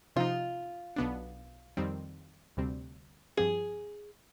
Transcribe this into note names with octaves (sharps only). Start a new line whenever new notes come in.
C3 F3 C4 D#4 F4
B1 B2 B3 D4
F2 D#3 G3 C4
D2 C3 G3 C4
G2 F3 C4 G4 G#4